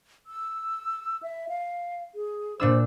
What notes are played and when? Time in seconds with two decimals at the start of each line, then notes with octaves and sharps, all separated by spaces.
0.27 E6
1.23 E5
1.49 F5
2.15 G#4
2.60 A#2 D4 C5 E6